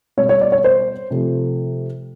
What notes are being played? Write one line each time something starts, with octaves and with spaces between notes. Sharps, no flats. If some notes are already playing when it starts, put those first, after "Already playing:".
B2 G3 C#5
C#5
D5
C#5
C5
C3 F3 A3